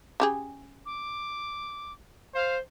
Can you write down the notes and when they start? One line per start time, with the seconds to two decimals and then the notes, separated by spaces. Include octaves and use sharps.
0.20 C#3 G4 G#4
0.86 D6
2.35 C5 F5